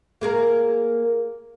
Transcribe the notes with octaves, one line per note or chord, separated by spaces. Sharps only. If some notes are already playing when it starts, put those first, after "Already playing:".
A#3 G#4 A#4